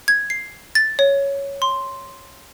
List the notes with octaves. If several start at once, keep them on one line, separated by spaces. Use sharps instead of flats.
G#6
C7
A6
C#5
C6